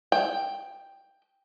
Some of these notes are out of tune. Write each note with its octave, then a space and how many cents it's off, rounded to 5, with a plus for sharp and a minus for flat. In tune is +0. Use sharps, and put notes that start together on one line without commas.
G5 +5